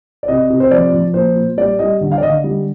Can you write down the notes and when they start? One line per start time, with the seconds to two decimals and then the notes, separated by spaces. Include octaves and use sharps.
0.23 D5
0.28 C3 D#5
0.50 C3
0.60 C5
0.71 F3 D5
0.93 F3
1.14 A#2 C5
1.36 A#2
1.57 G3 D5
1.79 G3 D#5
2.01 D3
2.12 F5
2.18 D5
2.22 D3 D#5
2.44 G3